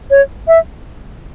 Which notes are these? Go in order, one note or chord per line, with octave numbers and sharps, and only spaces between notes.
C#5
E5